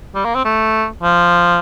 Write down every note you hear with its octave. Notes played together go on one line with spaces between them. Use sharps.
G3
A#3
C4
A3
F3